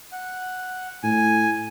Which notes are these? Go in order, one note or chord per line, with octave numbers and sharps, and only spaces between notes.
F#5
A2 G#5